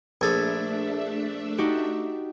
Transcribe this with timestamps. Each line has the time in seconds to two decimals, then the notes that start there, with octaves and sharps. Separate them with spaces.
0.21 A#1 A3 D4 A4 E5 D#6 G#6
1.58 D#4 F#4 G4